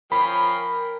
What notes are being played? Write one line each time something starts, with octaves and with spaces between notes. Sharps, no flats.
F3 C#4 A#4 G5 B5